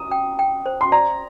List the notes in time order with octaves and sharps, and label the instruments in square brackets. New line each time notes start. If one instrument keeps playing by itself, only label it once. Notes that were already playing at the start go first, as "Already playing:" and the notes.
Already playing: [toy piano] A#5 [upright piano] D#6
[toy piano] G5
G5
C5
[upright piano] C6
[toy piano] D5 [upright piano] A#5